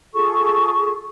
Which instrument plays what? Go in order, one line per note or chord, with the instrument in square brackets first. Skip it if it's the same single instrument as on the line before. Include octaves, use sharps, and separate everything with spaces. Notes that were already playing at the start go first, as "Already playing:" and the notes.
[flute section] F4 G#4 A4 C#6